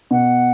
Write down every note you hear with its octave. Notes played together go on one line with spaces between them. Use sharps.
B2 F#5